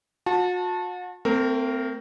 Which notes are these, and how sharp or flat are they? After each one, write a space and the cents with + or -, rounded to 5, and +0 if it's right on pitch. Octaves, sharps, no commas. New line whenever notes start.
F#4 -40 A5 +0
A3 +35 C4 -20 A#4 +0